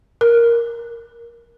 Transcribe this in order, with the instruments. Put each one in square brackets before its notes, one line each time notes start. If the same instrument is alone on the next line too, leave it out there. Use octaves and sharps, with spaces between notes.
[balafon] A#4